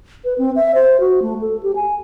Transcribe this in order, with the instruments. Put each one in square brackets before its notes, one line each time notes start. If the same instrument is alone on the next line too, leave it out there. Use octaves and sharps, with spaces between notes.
[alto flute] B4
C4
E5
C5
F#4
A3
A4
G4
G#5